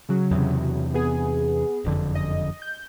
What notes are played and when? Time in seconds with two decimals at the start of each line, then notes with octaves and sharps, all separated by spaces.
0.09 C#3 F#3
0.31 E2 C3
0.94 B3 G#4
1.85 F#1 F2 D3
2.15 D#5
2.62 G6